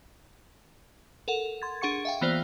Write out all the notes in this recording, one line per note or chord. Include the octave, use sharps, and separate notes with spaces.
A4 A#4 F#5
C6 G#6 A6
D4 G#4 F#5 C#6 C#7
E5 F5 G5
E3 A#3 B3 F4 C5 D5